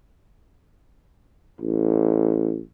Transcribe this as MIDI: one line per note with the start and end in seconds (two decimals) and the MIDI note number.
1.61 2.59 33